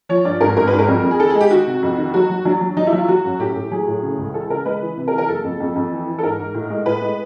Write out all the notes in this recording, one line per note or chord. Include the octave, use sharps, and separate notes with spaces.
F3 C#5
G2 D5
G#1 A#4
G#1 A#4
B4
G#1
A#4
F2
F2
G#4
D#3 A4
G#4
G#3
G4
D#3 F#4
C3
F2
D#3
F#3 F#4
F#3
F#3 D4
F#3
F#3 D#4
E4
F#3
F4
F#3 F#4
F#2
A2 G4
A2
F#3 G#4
A2
C#3
C#2
E3 A4
C#3 A#4
G#3 B4
E3
C3
A#4
E3
A#4
F#1 A4
F2
F2
F2
E3
E3
A4
G#2 A#4
G#2
A2
G#3
A2 B4
G#3